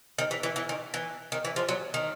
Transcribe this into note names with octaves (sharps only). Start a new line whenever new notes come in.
D#3
E3
E3
E3
D#3
E3
D#3
E3
F3
F#3
D#3